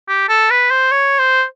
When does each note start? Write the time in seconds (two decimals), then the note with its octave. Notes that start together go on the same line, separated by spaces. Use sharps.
0.08 G4
0.29 A4
0.50 B4
0.70 C5
0.91 C#5
1.19 C5